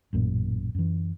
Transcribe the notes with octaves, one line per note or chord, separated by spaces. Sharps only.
A1 F#2 A#2
F#2 E3